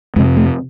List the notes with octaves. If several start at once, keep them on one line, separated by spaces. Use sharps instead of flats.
F2 C3 G#3
A3